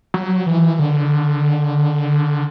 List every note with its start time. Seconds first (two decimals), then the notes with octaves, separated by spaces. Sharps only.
0.14 F#3
0.46 E3
0.79 D3